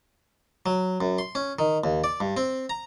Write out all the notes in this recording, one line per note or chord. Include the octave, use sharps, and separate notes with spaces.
F#3
F#2
C6
C#4
D#3
D#2
D5
G2
C4
A#5